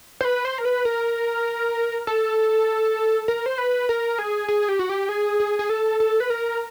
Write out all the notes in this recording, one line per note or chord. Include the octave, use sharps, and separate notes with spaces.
C5
B4
C5
A#4
B4
A#4
A4
A#4
C5
B4
A#4
G#4
G#4
G4
F#4
G4
G#4
G#4
G#4
A4
A4
B4
A#4